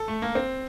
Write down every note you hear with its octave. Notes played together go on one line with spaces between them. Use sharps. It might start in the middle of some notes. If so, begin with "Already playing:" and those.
Already playing: A4
A3
A#3
C4